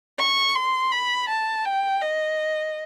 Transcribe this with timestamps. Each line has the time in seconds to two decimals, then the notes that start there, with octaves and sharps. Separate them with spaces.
0.19 C#6
0.55 C6
0.92 B5
1.29 A5
1.65 G5
2.01 D#5